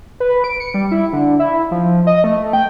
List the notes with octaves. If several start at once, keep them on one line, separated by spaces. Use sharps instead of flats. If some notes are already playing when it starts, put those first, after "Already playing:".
B4
D7
C#7
G3
E4
D3
E4
F3
D#5
A3
G5